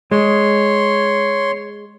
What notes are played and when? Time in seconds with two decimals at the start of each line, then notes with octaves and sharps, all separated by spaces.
0.11 G#3 C#5 C6